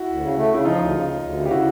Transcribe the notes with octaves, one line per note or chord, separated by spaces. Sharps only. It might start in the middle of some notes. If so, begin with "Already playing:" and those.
Already playing: E4 F#4
D2
C#3
A3
C#3 E4
F3 D#4 F4
D2
C#3
D2
D2
C#3
G4
E4 F#4